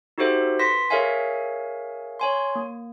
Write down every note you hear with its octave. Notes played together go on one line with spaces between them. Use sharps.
D#4 F#4 G4 A4 C5 E5
B4 C6 A#6 B6
G#4 A#4 C#5 E5 F5 G#5
C#5 G#5 C6
A#3